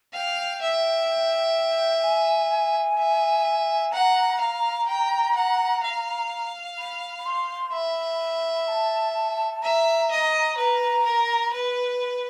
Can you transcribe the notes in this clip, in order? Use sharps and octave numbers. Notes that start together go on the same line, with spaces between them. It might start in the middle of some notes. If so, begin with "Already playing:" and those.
F5 G5
E5
G#5
E5
F#5 A#5
F5
G5
F#5
F5
B5
B5
C6
E5 B5
A5
E5 A#5
D#5
B4 A#5
A#4
B4 B5